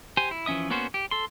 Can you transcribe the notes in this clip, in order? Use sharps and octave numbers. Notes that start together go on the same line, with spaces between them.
G4 C5 G#5
E4
E3 F3 C#4 E5 D#6
A#3 B3 C#4 F#4 C5
G4
A4 C6